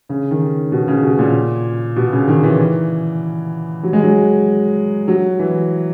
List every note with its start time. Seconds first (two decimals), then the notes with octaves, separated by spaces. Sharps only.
0.09 C#3
0.31 D#3
0.72 B2
0.88 C#3
1.03 B2
1.19 A#2
1.96 B2
2.12 C#3
2.28 D#3
2.43 E3
3.83 F#3
3.93 G#3
4.03 F#3
5.08 F#3
5.39 E3